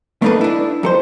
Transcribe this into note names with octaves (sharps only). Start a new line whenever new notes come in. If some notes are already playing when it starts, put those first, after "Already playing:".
A3 A#3 D4 D#4 A4 B4
D4 E4
F2 A4 C5